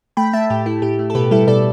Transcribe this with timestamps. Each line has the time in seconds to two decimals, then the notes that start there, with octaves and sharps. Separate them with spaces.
0.17 A3 G5 B5
0.33 A3 E5 A5
0.50 A2 G4
0.66 A3 E4
0.82 A2 G4
0.99 A3
1.10 A4
1.15 B2 G4 B4
1.31 G3 E4 A4
1.47 B2 A4 D5